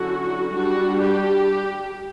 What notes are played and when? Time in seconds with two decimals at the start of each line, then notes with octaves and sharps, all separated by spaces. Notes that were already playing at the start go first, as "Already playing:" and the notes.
Already playing: D3 F#3 C#4 E4 F#4
0.53 G3 D4 F#4
1.02 G4